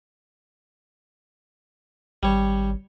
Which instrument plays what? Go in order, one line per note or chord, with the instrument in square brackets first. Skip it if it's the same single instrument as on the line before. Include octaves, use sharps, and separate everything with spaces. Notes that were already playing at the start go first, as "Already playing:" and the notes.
[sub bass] G#1 [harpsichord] G3 C#5